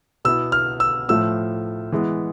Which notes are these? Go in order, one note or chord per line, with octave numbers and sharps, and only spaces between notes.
B2 B3 E4 E6
F6
E6
A2 F3 A3 E6
E3 G#3 B3